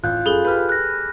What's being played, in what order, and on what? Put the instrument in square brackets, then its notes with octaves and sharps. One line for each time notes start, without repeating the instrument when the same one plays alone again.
[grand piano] A1 [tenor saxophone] F4 [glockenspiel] F#6 G6
[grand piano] F#2 [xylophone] G#4 A4 G7 [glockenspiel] G#5 B5
[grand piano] G4 B4 [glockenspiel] F6 G6
[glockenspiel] F#6 A#6